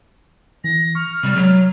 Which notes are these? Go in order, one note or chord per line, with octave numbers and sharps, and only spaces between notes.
E3 A#6
C#6 F6
C3 G3
F#3 G#3